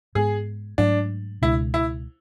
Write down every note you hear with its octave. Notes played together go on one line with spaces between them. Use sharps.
G#2 G#3 B3 G#4
G#2 F#3 A3 D4
C#2 B2 G#3 D4 E4
E4